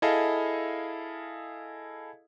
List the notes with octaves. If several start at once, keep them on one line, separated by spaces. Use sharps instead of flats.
E4 G#4 A4 D#5 F5